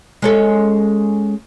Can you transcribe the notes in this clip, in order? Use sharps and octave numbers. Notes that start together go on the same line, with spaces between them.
G#3 C#4 A4